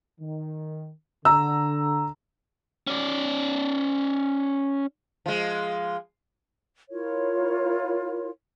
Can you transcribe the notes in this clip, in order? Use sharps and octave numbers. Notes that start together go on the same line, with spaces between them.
D#3
D3 A#5 E6
C#4 D5
F3 G#3
E4 F4 A#4 C#5